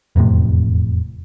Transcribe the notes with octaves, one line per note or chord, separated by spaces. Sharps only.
E1 F2 A2 C3